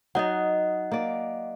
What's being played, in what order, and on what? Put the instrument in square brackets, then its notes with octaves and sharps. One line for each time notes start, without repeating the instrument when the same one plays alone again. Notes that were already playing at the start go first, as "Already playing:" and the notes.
[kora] F#3 D#4 [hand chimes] D#5 F#5
[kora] A#3 D5